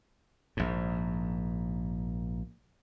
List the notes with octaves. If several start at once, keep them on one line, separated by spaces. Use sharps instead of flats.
A#1 G#2